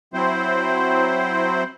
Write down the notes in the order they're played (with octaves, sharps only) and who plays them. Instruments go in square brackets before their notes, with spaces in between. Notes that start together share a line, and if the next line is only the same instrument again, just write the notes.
[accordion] F#3 C4 E4 C5